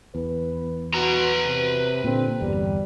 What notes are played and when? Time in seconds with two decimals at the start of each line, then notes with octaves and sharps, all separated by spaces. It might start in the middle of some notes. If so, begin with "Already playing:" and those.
0.15 E2 B4
0.94 F#4 B4 A#5
1.46 C3
2.04 A#2 D3 C4
2.40 G1 E2 G3